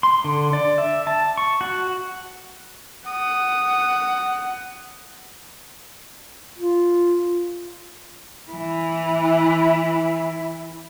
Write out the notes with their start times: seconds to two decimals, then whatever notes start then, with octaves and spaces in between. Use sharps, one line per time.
0.03 C6
0.24 D3
0.53 D5
0.78 E5
1.07 A5
1.38 C#6
1.61 F#4
3.07 F#5 D#6
6.59 F4
8.51 E3 E4